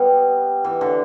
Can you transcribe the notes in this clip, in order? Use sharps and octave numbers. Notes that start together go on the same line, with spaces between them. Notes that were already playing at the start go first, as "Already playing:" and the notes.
Already playing: G3 B3
E3
D3